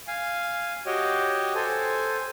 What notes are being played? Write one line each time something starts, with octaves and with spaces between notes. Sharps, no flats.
F5 G#5
F#4 G4 C#5 D#5 G5
A4 C5 G#5